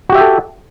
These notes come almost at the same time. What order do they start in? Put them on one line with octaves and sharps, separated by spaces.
F#4 G4 E5 G5 A4